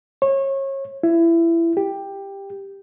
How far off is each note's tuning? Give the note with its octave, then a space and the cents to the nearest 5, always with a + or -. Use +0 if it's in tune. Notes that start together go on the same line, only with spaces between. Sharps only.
C#5 -30
E4 +20
G4 +10